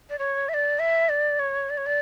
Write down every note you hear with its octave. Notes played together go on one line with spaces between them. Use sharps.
D5
C#5
E5
D5
E5
D5
C#5
D5
C#5
D5